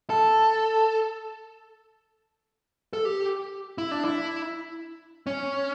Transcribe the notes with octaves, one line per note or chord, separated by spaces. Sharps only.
A4
A4
G4
E4
D4
E4
C#4